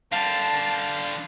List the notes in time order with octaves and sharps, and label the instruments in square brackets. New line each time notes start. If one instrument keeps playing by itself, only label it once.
[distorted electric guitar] D3 G3 [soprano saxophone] F5 [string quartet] A5